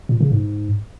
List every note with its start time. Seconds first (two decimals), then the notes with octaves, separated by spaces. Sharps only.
0.09 A#2
0.21 C#3
0.32 G#2